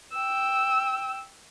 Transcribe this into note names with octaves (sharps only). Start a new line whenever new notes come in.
G5 E6